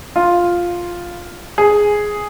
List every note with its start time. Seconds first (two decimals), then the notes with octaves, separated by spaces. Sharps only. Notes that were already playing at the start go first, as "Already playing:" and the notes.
0.16 F4
1.58 G#4